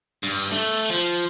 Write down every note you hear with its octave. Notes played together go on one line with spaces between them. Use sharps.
G2
A3
F3